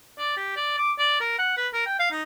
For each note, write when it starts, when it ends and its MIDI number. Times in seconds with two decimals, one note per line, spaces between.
0.19 0.35 74
0.37 0.53 67
0.56 0.75 74
0.78 0.92 86
0.99 1.20 74
1.21 1.37 70
1.39 1.53 78
1.57 1.68 71
1.74 1.83 70
1.86 1.99 79
1.99 2.07 77
2.11 2.22 63